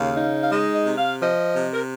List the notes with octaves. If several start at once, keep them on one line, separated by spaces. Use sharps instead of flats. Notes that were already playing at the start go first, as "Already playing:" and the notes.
Already playing: D#2 C#3 F5
D#4
F5
G#3 D#5
D#5
C3
F5
F3 D#5
C3
A#4